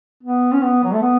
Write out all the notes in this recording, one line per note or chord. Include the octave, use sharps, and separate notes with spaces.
B3
C#4
B3
F#3
A3
B3